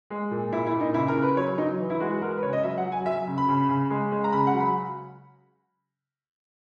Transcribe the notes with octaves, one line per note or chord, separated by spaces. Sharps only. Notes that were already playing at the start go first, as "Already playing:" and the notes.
G#3
A#2
A#2 E4
E4
A#2
D#4
C#3 E4
A#4
C#3
B4
F#3 C#5
F#3 D#4
E3
E4
G#3 F#4
F#4
G#3 A#4
B4
C#3 C#5
D#5
F#3 E5
F#5
F#3
G#5
F#3 E5
C#3
B5
C#3
C#3
G#3
G#3
A#5
C#3 B5
F#5
F#3
B5